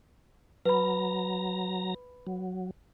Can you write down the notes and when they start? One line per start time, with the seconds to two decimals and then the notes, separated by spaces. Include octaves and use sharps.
0.65 F#3 B4 A#5 B5
2.27 F#3